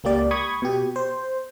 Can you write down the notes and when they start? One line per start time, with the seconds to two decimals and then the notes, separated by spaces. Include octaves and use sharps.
0.04 C#2 A#3 G4 D5
0.31 B5 C#6 D#6 G#6
0.62 B2 G4
0.96 C5